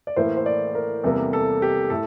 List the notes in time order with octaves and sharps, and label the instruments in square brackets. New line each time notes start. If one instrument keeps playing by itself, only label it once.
[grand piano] D5
A2 E3 A#3 C5
C5
D5
A#4
E2 C3 G3 A#3 A4
A4
G4
A2 A4